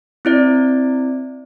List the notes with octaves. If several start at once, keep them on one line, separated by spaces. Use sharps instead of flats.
C4 E4 D5